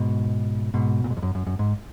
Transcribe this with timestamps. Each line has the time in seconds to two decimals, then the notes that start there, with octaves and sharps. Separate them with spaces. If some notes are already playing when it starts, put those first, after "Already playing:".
Already playing: G#2 B2
0.74 G#2 B2
1.04 A#2
1.10 G#2
1.17 F2
1.22 F#2
1.35 F#2
1.47 F#2
1.59 G#2